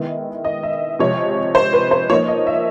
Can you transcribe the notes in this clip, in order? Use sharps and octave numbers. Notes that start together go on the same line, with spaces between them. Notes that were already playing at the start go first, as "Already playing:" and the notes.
Already playing: D#3 G#3 B3 E4
D#5
E5
C3 F3 G#3 C#5
C5
B4
C5
F3 A#3 D#4 C#5
D#5
E5